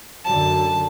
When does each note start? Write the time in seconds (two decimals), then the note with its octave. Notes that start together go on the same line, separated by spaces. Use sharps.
0.24 F#2 D3 F#3 A5